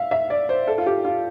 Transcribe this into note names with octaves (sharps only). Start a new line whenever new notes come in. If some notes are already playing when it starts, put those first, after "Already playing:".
Already playing: E5 F5
E5
D5
C5
A4
F4
G4
F4